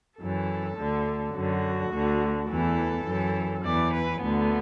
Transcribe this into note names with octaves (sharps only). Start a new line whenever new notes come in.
F#2 E3 A4
D2 D3
F#2 D3 F#4
D2 D3
E2 E3 A4
F#2 E3
E2 E3 D5
B4
D2 D3 B3